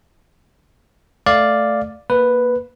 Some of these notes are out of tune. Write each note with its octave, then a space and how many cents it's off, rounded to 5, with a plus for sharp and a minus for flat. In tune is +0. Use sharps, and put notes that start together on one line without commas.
A3 +0 D5 +0 F5 +0
A#3 +5 B4 +0